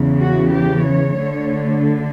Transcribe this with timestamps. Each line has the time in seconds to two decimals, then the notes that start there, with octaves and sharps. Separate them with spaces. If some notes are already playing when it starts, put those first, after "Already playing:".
Already playing: E2 C#3 E3
0.20 F#4
0.53 G4
0.86 C#5
1.18 D2 D3 A3